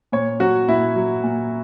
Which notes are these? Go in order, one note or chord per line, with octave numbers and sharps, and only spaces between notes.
A#2 C#5
F#3 F#4
A#2 E4
F#3
A#2